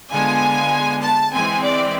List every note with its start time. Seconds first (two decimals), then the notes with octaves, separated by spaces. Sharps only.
0.11 D3 G#3 B3 F4 G#5
1.02 A5
1.32 E3 G#3 C4 G#5
1.63 D5